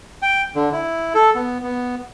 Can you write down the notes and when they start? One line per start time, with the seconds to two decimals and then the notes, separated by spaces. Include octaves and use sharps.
0.22 G5
0.55 D3
0.73 E4
1.14 A4
1.35 B3
1.63 B3